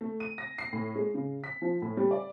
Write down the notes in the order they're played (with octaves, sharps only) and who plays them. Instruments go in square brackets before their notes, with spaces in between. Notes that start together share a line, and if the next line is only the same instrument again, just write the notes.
[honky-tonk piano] A3
D#7
A#6
C7
A2
G#3
C#3
B6
F3
A2
G3
D5